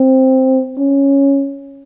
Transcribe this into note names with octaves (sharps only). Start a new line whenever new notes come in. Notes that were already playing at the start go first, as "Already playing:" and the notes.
Already playing: C4
C#4